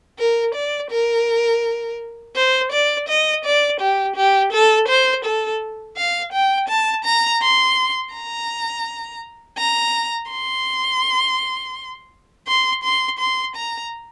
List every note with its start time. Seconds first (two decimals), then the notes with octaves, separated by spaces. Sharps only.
0.19 A#4
0.55 D5
0.91 A#4
2.36 C5
2.72 D5
3.09 D#5
3.45 D5
3.80 G4
4.16 G4
4.53 A4
4.88 C5
5.25 A4
5.97 F5
6.33 G5
6.69 A5
7.05 A#5
7.42 C6
8.14 A#5
9.58 A#5
10.31 C6
12.48 C6
12.84 C6
13.19 C6
13.56 A#5